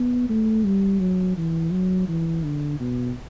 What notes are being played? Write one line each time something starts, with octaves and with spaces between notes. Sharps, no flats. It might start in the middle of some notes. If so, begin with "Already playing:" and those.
Already playing: B3
A3
G3
F#3
E3
F#3
E3
D3
B2